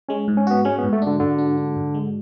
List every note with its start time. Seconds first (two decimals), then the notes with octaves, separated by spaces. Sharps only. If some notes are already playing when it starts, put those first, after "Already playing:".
0.09 G#3 C#4
0.28 G#2
0.37 C#4
0.47 B3 F#4
0.65 G#3 C#4
0.78 B3
0.84 G#2
0.93 A3
1.02 D3 D4
1.20 G#2 D3
1.38 D4
1.57 D4
1.76 G#2
1.94 G#3